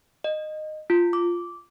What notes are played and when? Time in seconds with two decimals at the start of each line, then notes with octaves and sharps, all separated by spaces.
0.24 D#5
0.90 F4
1.13 D6